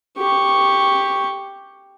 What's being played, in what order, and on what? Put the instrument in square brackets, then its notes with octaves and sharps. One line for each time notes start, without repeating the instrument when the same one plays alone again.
[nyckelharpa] G4 C#6